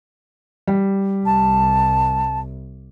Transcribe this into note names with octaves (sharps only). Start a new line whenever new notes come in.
G3
C2 A5